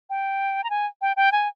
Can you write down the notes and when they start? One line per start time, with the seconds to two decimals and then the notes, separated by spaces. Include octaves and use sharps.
0.10 G5
0.64 A#5
0.70 G#5
1.01 G5
1.16 G5
1.32 G#5